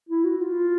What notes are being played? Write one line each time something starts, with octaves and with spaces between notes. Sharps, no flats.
E4
F#4
F4